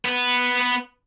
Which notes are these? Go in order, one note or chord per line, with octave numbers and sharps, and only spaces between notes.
B3 B4